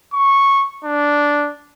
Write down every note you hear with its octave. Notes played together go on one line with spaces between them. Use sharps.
C#6
D4